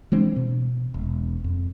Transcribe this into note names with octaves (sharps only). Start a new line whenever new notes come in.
E3 G#3 C4 D4
B2
E1
F2